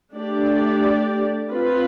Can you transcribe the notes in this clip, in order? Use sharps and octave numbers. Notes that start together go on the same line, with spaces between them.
A3 D4 G4 D5
C4 F4 B4